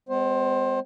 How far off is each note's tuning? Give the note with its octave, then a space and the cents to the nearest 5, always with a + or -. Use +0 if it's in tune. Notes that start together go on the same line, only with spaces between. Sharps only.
G#3 -30 C4 -45 C5 +20